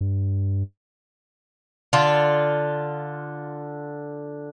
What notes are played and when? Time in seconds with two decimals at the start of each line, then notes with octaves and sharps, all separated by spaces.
0.01 G2
1.93 D3 F4